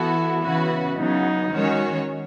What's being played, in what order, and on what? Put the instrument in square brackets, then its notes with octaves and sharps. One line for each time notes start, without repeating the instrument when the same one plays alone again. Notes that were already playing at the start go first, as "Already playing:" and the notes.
Already playing: [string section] E3 B3 F#4 A4 [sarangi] E4
[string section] C#3 E3 B3 F#4 B4
[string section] C#3 F#3 B3 [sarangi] D#4
[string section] D#3 G#3 C#4 F#4 C#5